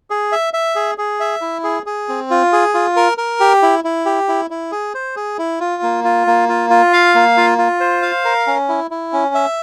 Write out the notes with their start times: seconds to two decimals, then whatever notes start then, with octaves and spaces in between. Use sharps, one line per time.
0.10 G#4
0.32 E5
0.54 E5
0.75 G#4
0.98 G#4
1.20 E5
1.41 E4
1.64 G#4
1.86 G#4
2.09 C4
2.30 F4
2.53 G#4
2.74 F4
2.96 A#4
3.18 A#4
3.40 G4
3.62 E4
3.84 E4
4.06 G4
4.28 E4
4.50 E4
4.72 G#4
4.94 C5
5.16 G#4
5.38 E4
5.60 F4
5.82 A#3
6.04 F4
6.27 A#3
6.49 F4
6.70 F4
6.93 F5
7.15 A#3
7.37 F4
7.58 F4
7.80 C5
8.02 F5
8.25 A#4
8.47 C#4
8.69 E4
8.91 E4
9.13 C#4
9.35 E5